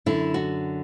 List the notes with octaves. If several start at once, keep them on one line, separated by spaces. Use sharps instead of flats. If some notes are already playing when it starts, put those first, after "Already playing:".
F#2 D3 E4
F#4